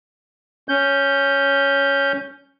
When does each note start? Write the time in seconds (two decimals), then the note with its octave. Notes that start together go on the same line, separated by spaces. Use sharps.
0.69 C#4 G6